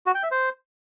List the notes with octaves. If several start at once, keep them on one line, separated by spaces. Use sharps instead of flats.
F#4
G5
E5
C5